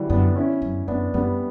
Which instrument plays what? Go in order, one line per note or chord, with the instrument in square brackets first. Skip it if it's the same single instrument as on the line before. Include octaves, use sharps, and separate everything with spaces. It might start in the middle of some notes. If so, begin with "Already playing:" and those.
Already playing: [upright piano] D3 E3 F#3 G3
[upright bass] F#2 [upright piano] B3 D4
[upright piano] C#4 E4
[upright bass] F#2
[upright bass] F#2 [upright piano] B3 D4
[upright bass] F#2 [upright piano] G3 B3